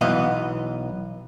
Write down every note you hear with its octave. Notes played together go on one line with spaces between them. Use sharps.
B1 E3 B3 D#5 F5